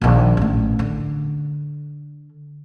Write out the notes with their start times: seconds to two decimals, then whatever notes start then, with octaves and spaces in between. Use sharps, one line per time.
0.01 A#1 D#3
0.37 A1 A3
0.79 D3